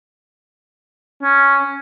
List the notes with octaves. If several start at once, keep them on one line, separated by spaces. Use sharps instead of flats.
C#4